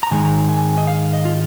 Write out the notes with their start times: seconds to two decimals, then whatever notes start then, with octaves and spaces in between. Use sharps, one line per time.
0.03 A#5
0.11 G#2 D#3 G#3 D#4 G#5
0.49 G#5
0.78 D#5
0.87 F5
1.13 D#5
1.25 F4